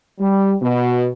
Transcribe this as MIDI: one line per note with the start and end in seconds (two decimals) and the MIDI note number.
0.19 0.54 55
0.62 1.07 47